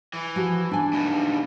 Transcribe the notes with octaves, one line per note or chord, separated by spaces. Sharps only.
E3
F3 F#4 G4
D4 G#5
D#2 B2